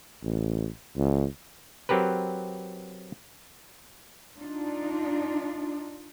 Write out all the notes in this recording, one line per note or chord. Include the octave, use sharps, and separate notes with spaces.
A1
C#2
F#3 C4 G4 A#4 B4
D4 D#4 F4